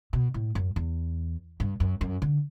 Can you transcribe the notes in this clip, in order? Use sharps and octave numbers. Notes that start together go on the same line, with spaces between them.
B2
A2
F#2
E2
G2
F#2
F#2
D3